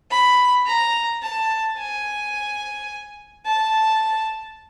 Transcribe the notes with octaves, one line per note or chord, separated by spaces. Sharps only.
B5
A#5
A5
G#5
A5